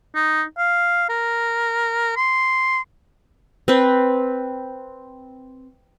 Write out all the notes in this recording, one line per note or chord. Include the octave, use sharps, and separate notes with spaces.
D#4
F5
A#4
C6
C4 B4